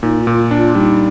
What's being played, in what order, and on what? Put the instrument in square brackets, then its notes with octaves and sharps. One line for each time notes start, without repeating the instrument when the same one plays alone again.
[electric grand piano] A#2 [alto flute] D#4
[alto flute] F4
[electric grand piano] A#2
D4
[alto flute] F4
[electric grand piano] G3 [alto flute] D#4